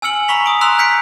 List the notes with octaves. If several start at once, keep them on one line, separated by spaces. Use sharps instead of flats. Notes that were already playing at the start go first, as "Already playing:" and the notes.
G#5 E6 F6 C#7 F#7
A#5 B5 C#6 B6 F7
D#6 D7
A#5 C6 E6 F#6 F7
F6 G6 B6 C#7 D7